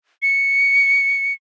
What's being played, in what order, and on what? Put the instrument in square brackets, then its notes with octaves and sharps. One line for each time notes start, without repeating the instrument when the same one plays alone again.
[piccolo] C#7